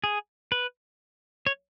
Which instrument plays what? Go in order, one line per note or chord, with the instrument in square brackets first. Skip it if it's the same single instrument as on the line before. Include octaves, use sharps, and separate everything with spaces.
[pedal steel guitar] G#4
B4
C#5